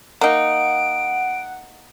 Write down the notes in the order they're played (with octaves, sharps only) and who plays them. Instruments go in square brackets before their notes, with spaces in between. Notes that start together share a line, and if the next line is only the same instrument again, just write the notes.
[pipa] A#3 D#4 [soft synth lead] F#5 [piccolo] D7